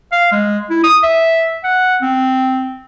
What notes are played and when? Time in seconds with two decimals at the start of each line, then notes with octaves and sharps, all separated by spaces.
0.12 F5
0.32 G#3
0.70 E4
0.84 D#6
1.03 E5
1.64 F#5
2.02 C4